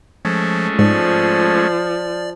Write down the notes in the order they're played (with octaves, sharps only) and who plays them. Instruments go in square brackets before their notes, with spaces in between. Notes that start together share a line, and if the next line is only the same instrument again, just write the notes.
[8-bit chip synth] F3 [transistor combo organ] G#3 A3 C#4
[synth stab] G#2 [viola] F3 [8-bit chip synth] D5